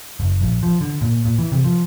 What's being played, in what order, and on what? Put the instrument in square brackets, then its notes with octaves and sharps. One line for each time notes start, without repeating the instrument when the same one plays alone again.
[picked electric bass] F#1
A#1
F3
D3
A#2
A#2
E3
C3
F3